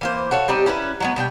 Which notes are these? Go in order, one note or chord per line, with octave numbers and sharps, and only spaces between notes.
E3 A#3 C5
F#4 A4 C#5 F5
G3 C4 D#4 G4
C#4 E4 A4 B4
F#3 G#3 B3
B2 G3 D4 G5